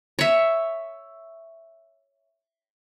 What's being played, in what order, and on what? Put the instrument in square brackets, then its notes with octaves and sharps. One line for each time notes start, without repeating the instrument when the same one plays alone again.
[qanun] C#5 E5